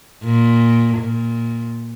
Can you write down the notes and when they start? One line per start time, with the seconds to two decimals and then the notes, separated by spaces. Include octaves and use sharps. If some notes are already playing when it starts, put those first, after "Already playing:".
0.24 A#2
0.97 A#2